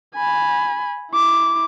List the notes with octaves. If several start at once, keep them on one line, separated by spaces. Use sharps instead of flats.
G#5 B5
E4 D6